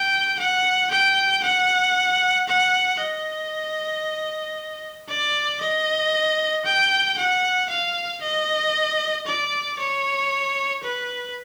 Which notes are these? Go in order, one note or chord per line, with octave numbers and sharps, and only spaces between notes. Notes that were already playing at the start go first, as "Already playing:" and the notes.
Already playing: G5
F#5
G5
F#5
F#5
D#5
D5
D#5
G5
F#5
F5
D#5
D5
C#5
B4